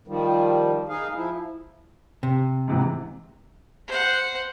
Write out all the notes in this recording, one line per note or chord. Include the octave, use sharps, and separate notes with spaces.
D#3 F3 G3
D#4 G#4 F5
F3 E4
C3
G#2 C3 E3
C5 F#5